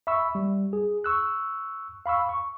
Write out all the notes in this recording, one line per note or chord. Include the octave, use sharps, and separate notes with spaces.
E5 B5 C#6 E6
G3
G#4
C#6 E6 F#6
F5 B5 C#6 E6
C#6